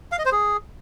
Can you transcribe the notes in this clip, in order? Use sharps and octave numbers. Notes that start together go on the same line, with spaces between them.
F5
D#5
C5
G#4